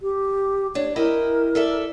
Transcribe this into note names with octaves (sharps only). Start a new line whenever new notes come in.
G4
D4 C#5
E4 G4 A#4 D#5
A4 D5 E5